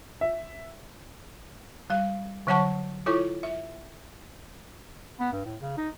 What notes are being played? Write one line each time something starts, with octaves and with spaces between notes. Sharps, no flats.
E5
G3 F5
D3 F#3 C#5 F#5 A5 C#6
E4 F4 A4 C#5 C#6
E5
B3
G2
A2
C#3
D#4